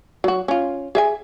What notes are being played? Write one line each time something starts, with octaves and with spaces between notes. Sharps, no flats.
F#3 F#4
C#4 F4
G#4 E5 G#5